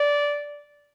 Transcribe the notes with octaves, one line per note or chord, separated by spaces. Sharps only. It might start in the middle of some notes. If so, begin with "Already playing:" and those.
Already playing: D5